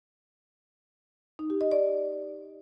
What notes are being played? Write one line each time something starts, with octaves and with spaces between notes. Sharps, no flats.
D#4
G4
D#5
D5